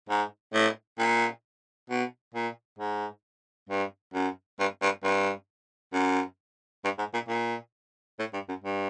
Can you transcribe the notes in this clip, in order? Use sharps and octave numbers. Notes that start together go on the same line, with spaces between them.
G#2
A2
A#2
B2
A#2
G#2
G2
F#2
G2
G2
G2
F#2
G2
G#2
A#2
A#2
A2
G2
F#2
G2